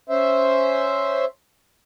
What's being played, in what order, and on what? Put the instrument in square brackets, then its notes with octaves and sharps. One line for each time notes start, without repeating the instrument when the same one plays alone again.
[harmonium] C#4 C5 E5